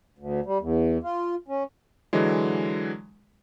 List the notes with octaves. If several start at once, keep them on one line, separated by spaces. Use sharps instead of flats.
D2
G3
E2
F4
C#4
D3 E3 F#3 G#3